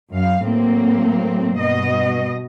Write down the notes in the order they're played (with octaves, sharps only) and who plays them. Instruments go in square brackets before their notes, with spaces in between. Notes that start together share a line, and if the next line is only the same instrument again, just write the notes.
[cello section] F#2 F5
A2 F#3 A#3 C4
G2 B2 D#5